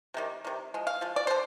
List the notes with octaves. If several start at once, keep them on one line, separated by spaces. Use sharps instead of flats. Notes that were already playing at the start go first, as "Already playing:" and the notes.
C3 D#3 G3
C3 D#3 G3
F3 G#3
F5
F3 G#3
D5
D3 D4 C5